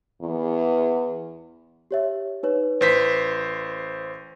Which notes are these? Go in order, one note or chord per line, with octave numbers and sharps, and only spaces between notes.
E2
G4 C#5 E5
D#4 B4 C#5
A1 B4 C5 B6